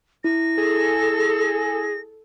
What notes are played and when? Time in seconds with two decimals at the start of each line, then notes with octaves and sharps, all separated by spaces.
0.24 E4 A#6
0.58 G#4 A4